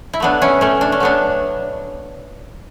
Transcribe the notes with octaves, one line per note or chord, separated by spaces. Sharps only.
E4
B2 F#3 A3 B3 D4
C#4 E4
A3 C#4
D4
C#4
B2 F#3 A3 B3 D4